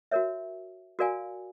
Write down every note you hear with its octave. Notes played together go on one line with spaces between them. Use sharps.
F#4 A#4 C#5 E5
F#4 A#4 D5 F5 G#5